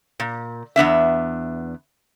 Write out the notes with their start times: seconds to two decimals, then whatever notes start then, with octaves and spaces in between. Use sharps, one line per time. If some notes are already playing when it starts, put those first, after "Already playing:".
0.20 A#2
0.76 E2 B3 D4 E5